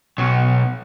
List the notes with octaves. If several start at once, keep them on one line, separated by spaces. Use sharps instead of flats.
B1 F#3